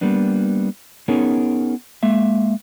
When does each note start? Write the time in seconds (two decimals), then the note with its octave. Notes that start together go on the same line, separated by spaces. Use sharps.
0.01 G3 A#3 B3 D4
1.08 B3 C#4 D#4 G#4 A#4 C#5
2.03 G#3 A#3 E5